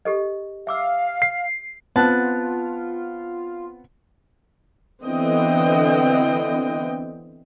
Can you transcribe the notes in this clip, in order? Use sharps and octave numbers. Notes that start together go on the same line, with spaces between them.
G4 A4 D#5
E5 F5 D6 E6
C7
B3 C4 F4 F#5 A5
D3 E3 B3 C4 D#5 G5